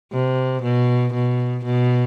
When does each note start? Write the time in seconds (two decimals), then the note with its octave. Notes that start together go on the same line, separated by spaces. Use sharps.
0.12 C3
0.63 B2
1.14 B2
1.65 B2